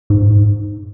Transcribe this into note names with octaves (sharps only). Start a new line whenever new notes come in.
G#2